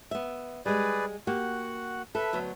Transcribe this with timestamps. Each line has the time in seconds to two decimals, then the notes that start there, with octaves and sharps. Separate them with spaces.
0.11 B3 E5
0.66 G3 G#3 G#4 B4 D5
1.27 A#3 F#4 G4 F#5
2.15 A4 B4 E5
2.33 D2 F#3 B3